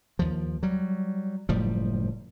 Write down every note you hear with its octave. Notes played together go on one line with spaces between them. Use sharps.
D#2 F3
F#3 G3
F#1 A2 F3 G3